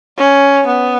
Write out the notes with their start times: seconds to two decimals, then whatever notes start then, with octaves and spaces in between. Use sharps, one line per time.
0.18 C#4
0.67 B3